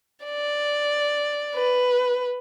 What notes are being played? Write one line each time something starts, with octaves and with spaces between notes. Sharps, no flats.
D5
B4